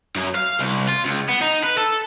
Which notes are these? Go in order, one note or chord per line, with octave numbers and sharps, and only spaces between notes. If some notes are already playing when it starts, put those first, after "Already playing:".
F#2
F5
C2
F4
C#2
B3
D#4
B4
A4